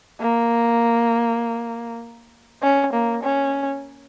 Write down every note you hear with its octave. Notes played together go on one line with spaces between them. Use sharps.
A#3
C#4
A#3
C#4